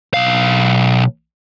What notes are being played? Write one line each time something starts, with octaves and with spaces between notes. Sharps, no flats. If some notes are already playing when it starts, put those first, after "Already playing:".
B1 F5